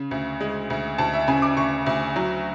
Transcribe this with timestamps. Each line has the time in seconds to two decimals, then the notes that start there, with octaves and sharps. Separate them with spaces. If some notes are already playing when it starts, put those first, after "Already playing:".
Already playing: C#3
0.11 D2
0.40 G#3
0.70 D2
0.98 D2 A5
1.13 E5
1.28 C#3 G#5
1.42 D6
1.57 D2 C#6
1.86 D2
2.16 F#3